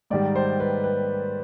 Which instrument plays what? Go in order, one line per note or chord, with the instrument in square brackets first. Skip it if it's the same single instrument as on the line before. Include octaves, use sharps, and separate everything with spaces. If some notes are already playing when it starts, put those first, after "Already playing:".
[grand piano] G#2 D#3 G3 D5
C5
B4
B4